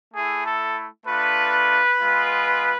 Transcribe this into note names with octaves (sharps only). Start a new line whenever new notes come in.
A3 E4 G#4
A4
A3 D4 F4 B4
G#3 B3 F4